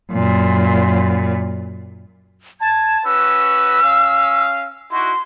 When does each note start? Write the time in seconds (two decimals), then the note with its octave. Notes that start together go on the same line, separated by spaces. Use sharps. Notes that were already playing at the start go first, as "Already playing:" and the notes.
0.11 F#2 A#2
2.61 A5 G#6
3.05 C#4 F#4 B4 E6
3.82 C#4 F5
4.91 D#4 E4 F#4 C6